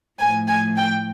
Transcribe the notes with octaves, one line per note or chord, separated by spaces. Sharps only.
A2 F3 G#5
G#5
G5